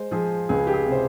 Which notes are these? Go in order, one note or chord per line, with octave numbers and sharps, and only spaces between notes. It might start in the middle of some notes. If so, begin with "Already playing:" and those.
Already playing: G#3 C5
F3 G#4
C#2 G#4
G4
G#4
C3
C5